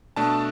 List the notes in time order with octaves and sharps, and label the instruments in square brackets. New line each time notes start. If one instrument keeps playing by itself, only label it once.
[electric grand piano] B2 A3 D4 A5